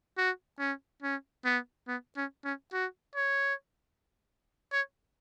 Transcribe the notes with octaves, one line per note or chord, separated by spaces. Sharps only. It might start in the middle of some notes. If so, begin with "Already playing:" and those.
F#4
C#4
C#4
B3
B3
C#4
C#4
F#4
C#5
C#5